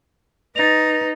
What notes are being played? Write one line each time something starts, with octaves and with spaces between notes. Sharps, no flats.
D#4 B4 A6 A#6 F7